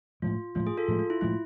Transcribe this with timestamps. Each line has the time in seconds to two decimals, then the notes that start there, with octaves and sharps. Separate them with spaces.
0.22 A2 F3 G#3 F4
0.55 A2 F3 G#3 F4
0.67 G#4
0.77 F4 A4
0.88 A2 F3 G#3
0.99 F4
1.10 E4
1.21 A2 F3 G#3 E4